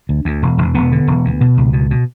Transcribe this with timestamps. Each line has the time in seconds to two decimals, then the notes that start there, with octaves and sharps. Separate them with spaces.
0.09 D2
0.25 D2
0.42 E1
0.58 E1
0.75 E1 B3
0.92 D3
1.07 E1
1.25 D2
1.41 B2
1.57 C#2
1.73 B2
1.91 B2